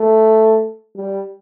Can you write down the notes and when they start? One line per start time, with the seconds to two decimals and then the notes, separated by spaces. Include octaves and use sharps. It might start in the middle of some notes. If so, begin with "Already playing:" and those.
Already playing: A3
0.96 G3